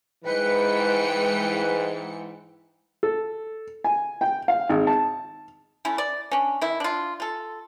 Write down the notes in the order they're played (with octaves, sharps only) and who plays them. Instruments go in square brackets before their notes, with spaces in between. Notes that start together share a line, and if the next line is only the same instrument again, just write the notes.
[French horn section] G#2 E3 [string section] G#3 G5 C#7 [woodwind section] B4
[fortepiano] A4
G#5
G5
F5
G#1
A5
[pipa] A3 C#4 E4
D5
C#4 D4
D#3 E4
D4 F4
F4 A4